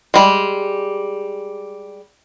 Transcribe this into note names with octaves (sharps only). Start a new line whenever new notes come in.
G3 G#3